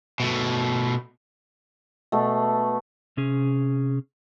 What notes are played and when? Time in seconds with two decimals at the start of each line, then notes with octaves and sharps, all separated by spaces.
0.20 B2 A3
2.12 B2 A3
3.17 C3 C#4 G#4